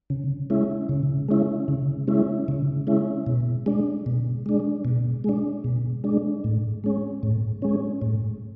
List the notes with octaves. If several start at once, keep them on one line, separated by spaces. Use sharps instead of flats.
C#3
G#3 C#4 E4
C#3
G#3 C#4 E4
C#3
G#3 C#4 E4
C#3
G#3 C#4 E4
B2
G#3 D4
B2
G#3 D4
B2
G#3 D4
B2
G#3 D4
A2
G#3 C#4
A2
G#3 C#4
A2